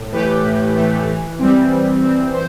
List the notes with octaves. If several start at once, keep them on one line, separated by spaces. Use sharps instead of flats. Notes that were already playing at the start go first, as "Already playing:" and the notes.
Already playing: A2
E3 A3 G4 B4
A2
E3 A3
E3
G3 C4
E3
G3 C4
E3 C5